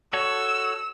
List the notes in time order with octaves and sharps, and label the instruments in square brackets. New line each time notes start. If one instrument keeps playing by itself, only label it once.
[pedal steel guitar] F#4 A4 C#5 [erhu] E6